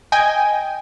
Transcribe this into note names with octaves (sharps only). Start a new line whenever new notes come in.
D#5 G5 G#5